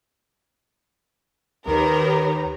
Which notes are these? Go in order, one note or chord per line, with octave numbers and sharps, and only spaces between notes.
D#2 D#3 G4 A#4 B4 C#5 A#5